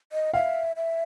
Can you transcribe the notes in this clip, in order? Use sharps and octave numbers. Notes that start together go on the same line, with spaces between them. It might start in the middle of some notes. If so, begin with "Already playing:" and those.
D#5
E5 F5
E5